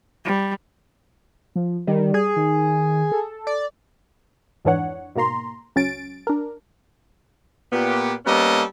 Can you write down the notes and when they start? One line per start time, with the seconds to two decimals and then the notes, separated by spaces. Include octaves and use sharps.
0.25 G3
1.55 F3
1.87 D#3 G3
2.14 G#4
2.36 D#3
3.12 A4
3.47 D5
4.65 F2 G#2 E3 D4 C#5 F#5
5.15 G#2 B2 A#3 A#5 C6
5.76 C#2 F#3 C#4 A6 D7
6.27 D4 A#4
7.72 A#2 B3 G4
8.26 G3 A#3 B3 C#4 A4 D#5